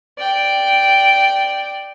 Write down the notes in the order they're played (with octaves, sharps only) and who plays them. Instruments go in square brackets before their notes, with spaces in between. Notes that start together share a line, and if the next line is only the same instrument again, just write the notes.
[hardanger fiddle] D5 G5